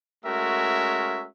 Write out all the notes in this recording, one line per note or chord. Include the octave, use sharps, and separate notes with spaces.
G#3 A3 C#4 F#4 A#4 E5